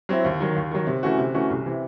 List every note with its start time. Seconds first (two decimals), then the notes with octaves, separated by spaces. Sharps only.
0.09 F#3 C4 E4
0.24 D#2
0.40 D#3 F#3
0.56 D#2
0.71 D#3 F#3
0.86 C3
1.03 E3 A3 C#4 F#4
1.18 C3
1.34 E3 A3 C#4 F#4
1.50 C2
1.66 C3 E3